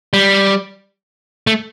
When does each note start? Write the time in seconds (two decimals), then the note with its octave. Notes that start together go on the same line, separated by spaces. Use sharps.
0.13 G3
1.47 A3